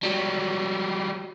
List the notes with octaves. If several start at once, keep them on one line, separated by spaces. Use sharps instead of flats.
F#3 G3